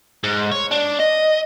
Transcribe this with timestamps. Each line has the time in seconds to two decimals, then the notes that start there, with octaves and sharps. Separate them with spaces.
0.24 G#2
0.51 C#5
0.71 D4
0.99 D#5